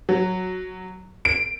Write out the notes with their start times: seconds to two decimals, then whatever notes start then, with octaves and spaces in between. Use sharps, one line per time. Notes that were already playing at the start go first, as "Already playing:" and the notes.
0.09 F#3
1.25 D7